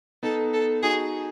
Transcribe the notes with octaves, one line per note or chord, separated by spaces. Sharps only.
B3 D#4 A4
A4
D#4 F#4 G#4